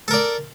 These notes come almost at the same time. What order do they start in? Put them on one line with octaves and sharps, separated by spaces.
A4 A#4 D5